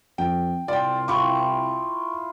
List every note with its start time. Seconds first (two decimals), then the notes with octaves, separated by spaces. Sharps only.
0.18 F2 G5
0.68 C2 F4 D5 G5
1.08 E4 F4 G5 C#6 D6